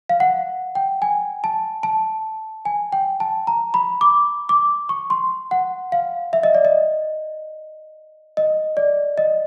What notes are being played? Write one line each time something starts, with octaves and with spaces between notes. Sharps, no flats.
F5
F#5
G5
G#5
A5
A5
G#5
G5
A5
A#5
B5
D6
D6
C#6
C6
F#5
F5
E5
D#5
D5
D#5
D#5
D5
D#5